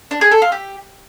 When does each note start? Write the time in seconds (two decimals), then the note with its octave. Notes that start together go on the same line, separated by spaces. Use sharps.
0.11 D4
0.21 G#4
0.32 A4
0.42 F4
0.52 G4